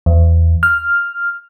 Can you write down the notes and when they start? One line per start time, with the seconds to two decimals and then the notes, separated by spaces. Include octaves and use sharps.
0.06 E2
0.63 F6